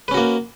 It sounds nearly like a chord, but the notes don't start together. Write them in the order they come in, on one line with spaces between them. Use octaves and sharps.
B4 C#4 F#4 A#3